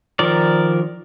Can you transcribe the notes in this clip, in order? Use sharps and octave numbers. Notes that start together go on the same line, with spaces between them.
D#3 F3 A#4 D5